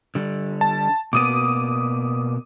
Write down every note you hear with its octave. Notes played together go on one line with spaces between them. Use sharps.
D3 G3
A5
B2 A#3 B3 D6 D#6 D#7